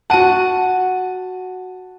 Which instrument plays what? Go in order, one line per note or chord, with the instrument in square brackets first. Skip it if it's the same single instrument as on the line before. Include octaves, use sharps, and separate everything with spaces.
[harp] F#4 F#5 [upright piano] A5 D#7